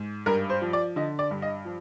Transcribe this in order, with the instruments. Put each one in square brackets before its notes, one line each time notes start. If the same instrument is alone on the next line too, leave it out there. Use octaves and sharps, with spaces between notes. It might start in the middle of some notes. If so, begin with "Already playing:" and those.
Already playing: [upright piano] G#2
G2 A#4
C5
F3
D5
D3 D#5
D5
G2
D#5
F3